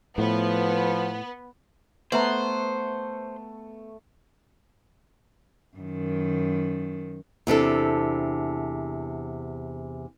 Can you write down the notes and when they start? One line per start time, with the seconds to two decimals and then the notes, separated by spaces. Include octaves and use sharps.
0.18 A2 F3 B3
2.12 A3 B3 B4 C5 E5 A#5
5.77 F#2 D#3
7.47 E2 C3 D4 A4